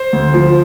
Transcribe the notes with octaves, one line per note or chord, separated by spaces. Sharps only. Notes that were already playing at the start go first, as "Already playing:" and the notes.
Already playing: C5
D2
F3